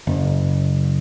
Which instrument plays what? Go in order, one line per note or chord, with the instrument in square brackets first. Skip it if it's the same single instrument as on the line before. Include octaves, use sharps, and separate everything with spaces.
[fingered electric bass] F#1